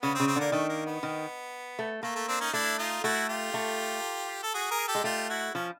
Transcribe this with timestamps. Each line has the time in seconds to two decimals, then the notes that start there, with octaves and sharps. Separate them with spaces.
0.02 C#3 B3
0.15 C4
0.20 C#3
0.28 C4
0.36 D3 A#3
0.52 D#3 A3
0.69 A#3
0.86 B3
1.03 D#3
1.79 A3
2.03 A3 A#3
2.16 A3
2.28 C4 D4
2.41 C#4 D#4
2.53 A3 D4 E4
2.79 D#4 F4
3.04 A3 E4 F#4
3.29 F4 G4
3.54 A3
4.43 A4
4.54 F#4 G#4
4.71 G#4 A#4
4.88 G4 A4
4.95 G#3
5.04 A3 F4 G4
5.29 E4 F#4
5.55 F3 C#4